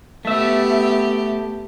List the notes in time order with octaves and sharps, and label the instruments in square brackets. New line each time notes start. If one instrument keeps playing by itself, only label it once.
[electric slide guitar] A3 E5 [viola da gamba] B3 G4